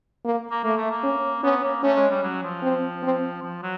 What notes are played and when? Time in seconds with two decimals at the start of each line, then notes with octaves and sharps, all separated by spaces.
0.24 A#3
0.51 A#3
0.63 A3 A#3
0.77 A3
0.90 A#3
1.03 C#4
1.43 B3 C#4
1.64 A#3
1.83 A3 C#4
1.97 G#3
2.10 G3
2.23 F#3
2.43 F3
2.62 C4
3.02 C4
3.42 F3
3.62 F#3